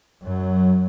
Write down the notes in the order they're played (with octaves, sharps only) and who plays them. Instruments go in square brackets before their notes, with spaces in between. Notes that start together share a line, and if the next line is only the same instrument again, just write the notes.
[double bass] F#2 F#3